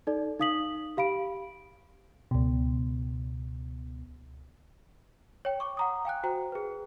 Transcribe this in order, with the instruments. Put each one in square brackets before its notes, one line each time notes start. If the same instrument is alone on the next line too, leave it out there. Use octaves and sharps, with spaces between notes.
[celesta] D#4 A4 D5
D#4 F5 D#6 B6 F#7
G4 F5 B5 D7
[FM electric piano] C#2 B2
[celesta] C#5 G5
C#6 D6
F#5 A#5 D#6
F5 G5 G#5 F#6
F#4 C5 G5 A#5
G#4 B4